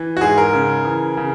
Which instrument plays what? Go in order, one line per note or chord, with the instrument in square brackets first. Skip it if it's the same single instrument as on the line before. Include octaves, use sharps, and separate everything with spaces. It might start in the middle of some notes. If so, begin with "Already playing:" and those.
Already playing: [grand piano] E3
F#4
G#2 G#4
A#4
C#3
E3
C#3